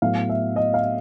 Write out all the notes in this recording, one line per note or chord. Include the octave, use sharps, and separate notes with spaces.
A2 F#3 B3 F5
E5
D#5
F5